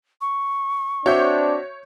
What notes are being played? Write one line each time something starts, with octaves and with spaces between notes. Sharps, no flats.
C#6
C4 D4 F#4 C#5 E5 G6